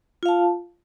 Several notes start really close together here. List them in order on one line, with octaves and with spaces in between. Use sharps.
F4 F5 A5